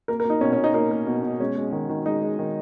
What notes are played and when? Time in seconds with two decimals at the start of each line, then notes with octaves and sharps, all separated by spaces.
0.08 A#3 A#4
0.20 A#4
0.25 A#3
0.30 D#4
0.41 B2 C#4
0.53 C#4
0.58 B2
0.64 D#4
0.74 A#3 D#4
0.91 A#3
1.07 B2
1.23 B2
1.40 G#3 C#4
1.57 G#3
1.72 D#3
1.89 D#3
2.06 G#3 D#4
2.22 G#3
2.39 D#3